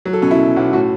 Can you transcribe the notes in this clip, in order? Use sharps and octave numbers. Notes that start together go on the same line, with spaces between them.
F#3
A4
B2 C#4
E4
B2
B1
A2 F#4